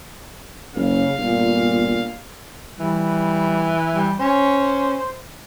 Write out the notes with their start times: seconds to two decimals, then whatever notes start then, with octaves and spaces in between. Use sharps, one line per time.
0.75 F#1 C#3 F5
1.18 G1 A#2
2.79 E3 G3
3.94 G3
4.20 C#4 C5